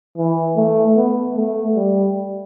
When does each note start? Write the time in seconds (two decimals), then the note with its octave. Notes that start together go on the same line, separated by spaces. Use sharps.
0.17 E3
0.56 A3
0.96 B3
1.36 A3
1.76 G3